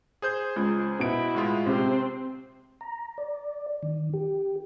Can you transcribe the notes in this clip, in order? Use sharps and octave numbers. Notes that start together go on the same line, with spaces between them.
G#4 C5 G6
C#2
B2 E4 D7
A2 G#3 F4
C3 C4
A#5
D5
D#3
G4